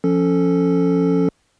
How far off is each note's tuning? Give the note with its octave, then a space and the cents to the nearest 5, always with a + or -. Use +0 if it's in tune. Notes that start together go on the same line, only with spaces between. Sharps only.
F3 +0 C#4 +0 A4 +0